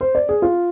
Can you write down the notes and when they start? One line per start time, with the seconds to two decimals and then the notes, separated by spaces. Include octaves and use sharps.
0.01 C5
0.15 D5
0.29 G#4
0.42 F4